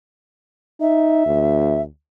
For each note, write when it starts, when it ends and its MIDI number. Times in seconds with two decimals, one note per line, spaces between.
0.81 1.22 63
0.81 1.82 76
1.26 1.87 38